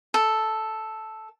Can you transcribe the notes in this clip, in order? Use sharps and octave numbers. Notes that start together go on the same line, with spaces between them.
A4